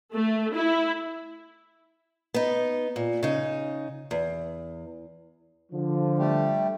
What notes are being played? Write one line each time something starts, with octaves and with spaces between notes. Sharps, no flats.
A3
E4
B3 D#4
A#2
C#3 D#4
E2
D3 F3
G3 A3 G4